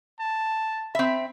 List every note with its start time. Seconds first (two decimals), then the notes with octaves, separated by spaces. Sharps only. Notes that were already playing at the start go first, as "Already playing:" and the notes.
0.20 A5
0.95 C4 E5 B5